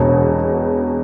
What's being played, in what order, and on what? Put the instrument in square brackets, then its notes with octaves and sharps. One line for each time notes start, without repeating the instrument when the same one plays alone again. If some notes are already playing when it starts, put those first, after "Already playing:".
Already playing: [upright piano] E1 E2 B2